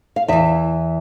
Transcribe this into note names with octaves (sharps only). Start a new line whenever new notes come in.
F5
E2 E3 E5